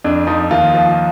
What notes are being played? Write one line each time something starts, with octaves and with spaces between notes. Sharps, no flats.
F2 D4
F3 D#4
D#2 F4
F3